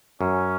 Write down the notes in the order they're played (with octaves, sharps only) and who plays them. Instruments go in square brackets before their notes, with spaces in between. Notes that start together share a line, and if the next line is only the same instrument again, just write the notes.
[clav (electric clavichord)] F#2 [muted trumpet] C#4